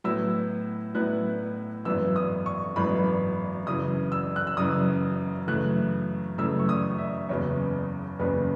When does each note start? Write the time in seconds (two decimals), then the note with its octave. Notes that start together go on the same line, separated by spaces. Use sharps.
0.04 A2 F#3 B3 E4 E6
0.95 A2 F#3 B3 E4 F#6
1.85 G#1 F#2 E3 B3 E6
2.16 D#6
2.46 C#6
2.76 G#1 F#2 E3 B3 B5
3.66 F#2 C#3 E3 D#6
4.12 E6
4.36 F#6
4.47 E6
4.57 F#2 C#3 E3 D#6
5.48 F#2 C#3 E3 A3 F#6
6.38 F#2 C#3 E3 A3 E6
6.59 C#6
6.69 D#6
6.98 E5
7.29 F#1 E2 C#3 F#3 B3 C#5
8.19 F#1 E2 C#3 F#3 B3 B4